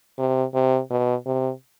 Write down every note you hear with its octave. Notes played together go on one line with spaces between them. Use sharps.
C3
C3
B2
C3